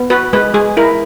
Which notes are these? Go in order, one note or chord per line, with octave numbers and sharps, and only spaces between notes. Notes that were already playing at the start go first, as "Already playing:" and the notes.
Already playing: B3
F#4 B4
G#3 B4
G#3 G#4
E4 A#4